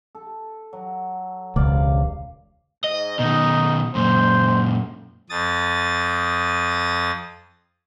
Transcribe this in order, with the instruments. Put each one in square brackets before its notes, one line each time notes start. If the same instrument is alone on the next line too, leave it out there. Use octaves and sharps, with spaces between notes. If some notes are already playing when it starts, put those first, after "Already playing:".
[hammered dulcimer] A4
F#3
[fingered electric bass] E1 C#2 [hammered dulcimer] C3 D5 F5
[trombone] G#2 [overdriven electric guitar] D#5
[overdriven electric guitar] B2 D#3 [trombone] D#4
[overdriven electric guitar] F#2 A#2 [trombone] C5
[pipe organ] F2 D#6 A6